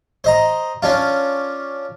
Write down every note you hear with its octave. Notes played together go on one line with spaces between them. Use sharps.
C5 D#5 A#5
C#4 D4 F4